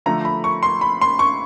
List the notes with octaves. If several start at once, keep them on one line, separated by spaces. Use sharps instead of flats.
D3 F3 A3 A#5
B5
C#6
C6
B5
C6
C#6